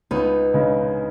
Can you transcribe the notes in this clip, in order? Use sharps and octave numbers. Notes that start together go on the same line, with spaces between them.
C#2 B3 D#4
C#3 G#3